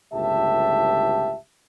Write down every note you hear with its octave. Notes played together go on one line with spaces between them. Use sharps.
G1 C#2 A2 G4 E5 A5